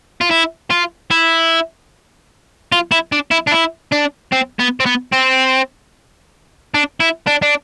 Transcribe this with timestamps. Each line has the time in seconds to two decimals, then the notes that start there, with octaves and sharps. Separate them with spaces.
0.21 F4
0.31 E4
0.70 F4
1.11 E4
2.72 F4
2.92 E4
3.12 D4
3.31 E4
3.48 D4
3.52 E4
3.92 D4
4.33 C4
4.60 B3
4.80 C4
4.86 B3
5.12 C4
6.74 D4
7.00 E4
7.27 D4
7.42 D4